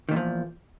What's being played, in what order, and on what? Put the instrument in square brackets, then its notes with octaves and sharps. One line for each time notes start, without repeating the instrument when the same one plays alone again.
[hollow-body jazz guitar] D#3
A#2
E2
F3